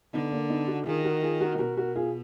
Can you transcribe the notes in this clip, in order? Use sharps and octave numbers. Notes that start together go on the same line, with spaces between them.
D3 B3 D#4
A#3 D4
B3 D#4
D#4 F#4
D#3 F4 G#4
F#4 A#4
F4 G#4
F#4 A#4
B2 F#4 A#4
F#4 A#4
F4 G#4